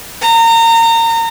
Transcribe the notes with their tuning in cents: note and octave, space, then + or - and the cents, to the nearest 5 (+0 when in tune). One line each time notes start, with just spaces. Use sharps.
A#5 -30